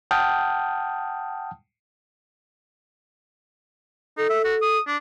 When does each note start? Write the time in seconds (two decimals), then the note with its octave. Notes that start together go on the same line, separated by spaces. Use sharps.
0.11 F#5 G5 A5 D#6 F6 G6
4.17 D#4 A4
4.30 E5
4.45 F#4
4.62 D#6
4.87 D4